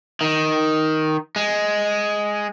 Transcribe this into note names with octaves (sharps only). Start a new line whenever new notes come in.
D#3
G#3